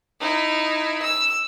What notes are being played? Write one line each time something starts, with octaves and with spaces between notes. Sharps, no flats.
D#4 E4
E6